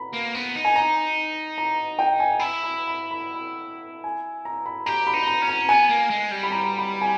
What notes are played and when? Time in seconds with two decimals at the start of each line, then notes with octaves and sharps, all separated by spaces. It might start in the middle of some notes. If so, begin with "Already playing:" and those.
Already playing: B4 A#5 B5
0.13 A#3
0.35 B3
0.55 D#4
0.65 G#5
0.76 A#5
1.58 A#5
1.99 G5
2.20 G#5
2.39 E4 B5
2.63 B5
2.87 B5
3.11 B5
3.34 B5
4.04 G#5
4.45 A#5
4.66 B5
4.86 G4 A#5
5.07 B5
5.14 D#4
5.27 A#5
5.42 C#4
5.48 A#5
5.69 B3 G#5
5.89 A#3
6.10 G#3
6.31 G3
6.43 B5
6.52 A#5
6.78 B5
7.02 G#5